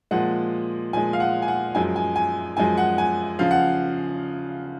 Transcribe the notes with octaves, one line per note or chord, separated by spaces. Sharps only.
A#2 F3 G#3 F#5
A#2 F3 G#3 G#5
F5
F#5
G#5
F#5
F#2 F3 G#3 G#5
G#5
G#5
F#2 F3 G#3 G#5
F#5
G#5
C#3 F3 F5
F#5